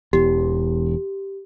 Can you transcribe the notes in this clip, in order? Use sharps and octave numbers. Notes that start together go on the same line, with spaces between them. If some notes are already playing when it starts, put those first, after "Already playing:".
E1 E2 G4